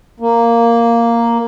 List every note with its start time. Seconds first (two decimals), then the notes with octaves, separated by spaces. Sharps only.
0.20 A#3